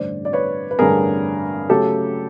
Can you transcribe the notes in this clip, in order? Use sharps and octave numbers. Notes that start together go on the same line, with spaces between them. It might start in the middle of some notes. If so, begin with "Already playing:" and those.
Already playing: A1 G2 D3 C5 D5
D5
B4 C#5
B4
A1 G2 D3 G#4 A#4
C#3 F#3 A3 G4 A4